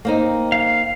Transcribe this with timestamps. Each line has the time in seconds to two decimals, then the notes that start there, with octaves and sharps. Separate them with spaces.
0.05 A#3 C4 D#4
0.52 F5